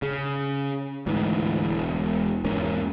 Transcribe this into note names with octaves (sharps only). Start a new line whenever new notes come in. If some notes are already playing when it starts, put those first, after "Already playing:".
C#3
D2 G#2 E3
E1
E2 G#2 A#3 C#4